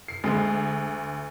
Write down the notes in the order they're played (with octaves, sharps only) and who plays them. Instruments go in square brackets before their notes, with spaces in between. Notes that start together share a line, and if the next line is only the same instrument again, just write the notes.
[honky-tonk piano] C7
[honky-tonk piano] D2 [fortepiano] G#3